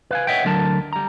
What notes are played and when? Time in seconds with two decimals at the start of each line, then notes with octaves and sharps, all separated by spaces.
0.11 B4 F5 G#5
0.27 B4 C#5 D#5 E5 F#5 G5
0.45 D2 D3 F#3 A#4 A5
0.93 G3 A#5